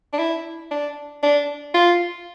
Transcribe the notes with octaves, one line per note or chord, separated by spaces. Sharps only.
D4
E4
D4
D4
F4